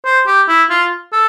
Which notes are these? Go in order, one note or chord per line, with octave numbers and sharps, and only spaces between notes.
C5
G4
E4
F4
A4